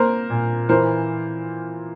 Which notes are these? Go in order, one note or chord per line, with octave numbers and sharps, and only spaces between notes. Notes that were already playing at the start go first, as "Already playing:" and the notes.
Already playing: A#3 A#4 C5
A#2
E3 A#4 C5